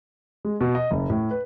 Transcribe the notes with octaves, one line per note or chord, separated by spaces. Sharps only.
G#3
B2
D#5
F#1
A2
B4